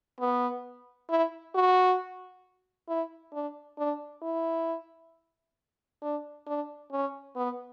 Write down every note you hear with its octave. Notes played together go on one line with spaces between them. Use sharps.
B3
E4
F#4
E4
D4
D4
E4
D4
D4
C#4
B3